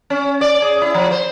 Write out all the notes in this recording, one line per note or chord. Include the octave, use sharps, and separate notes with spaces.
C#4
D5
G#4
E4
F3
C5